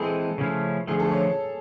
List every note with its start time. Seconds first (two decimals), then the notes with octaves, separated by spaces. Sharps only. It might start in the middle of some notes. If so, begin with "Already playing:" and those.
Already playing: E3 G#3 C4 G#4 A4 B4
0.38 C#3 F3 A3 C#4 E4
0.87 D3 F3 A3 G#4
1.00 A4
1.11 C#5